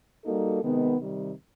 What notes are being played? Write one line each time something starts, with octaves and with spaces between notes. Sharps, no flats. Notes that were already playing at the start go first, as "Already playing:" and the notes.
G3 A#3 D#4 F#4 A4
C3 D#3 G#3 B3
C3 D#3 G3